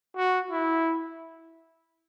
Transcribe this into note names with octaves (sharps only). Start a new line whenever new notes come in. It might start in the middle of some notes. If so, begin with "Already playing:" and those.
F#4
E4